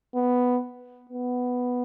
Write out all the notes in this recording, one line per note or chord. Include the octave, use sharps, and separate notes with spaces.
B3
B3